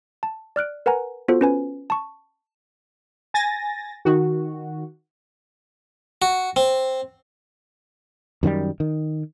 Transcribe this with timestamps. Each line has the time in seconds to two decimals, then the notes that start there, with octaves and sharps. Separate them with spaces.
0.23 A5
0.56 D5 F6 F#6 D7
0.86 A#4 B4 F#5 G#5 A#5
1.28 B3 F4 F#4 A4 C5
1.41 C#4 B4 G#5
1.90 A5 C#6
3.34 G#5 A6 A#6
4.05 D#3 F#4
6.22 F#4
6.56 C4
8.43 F#2 D#3 F3 G3
8.80 D#3